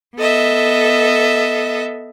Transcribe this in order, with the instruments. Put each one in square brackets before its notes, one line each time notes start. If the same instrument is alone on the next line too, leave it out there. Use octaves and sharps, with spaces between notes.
[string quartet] B3 A4 D#5 E5